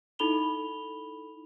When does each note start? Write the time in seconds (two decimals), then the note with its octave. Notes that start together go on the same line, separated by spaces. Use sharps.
0.19 D#4 E4 A4 B5 F7 G7